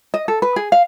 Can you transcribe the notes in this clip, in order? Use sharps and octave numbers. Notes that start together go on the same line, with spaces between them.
D#5
A4
B4
G#4
F5